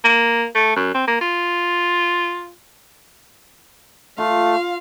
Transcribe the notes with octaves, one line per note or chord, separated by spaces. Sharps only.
A#3
A3
F#2
C4
A#3
F4
A3 F4 F5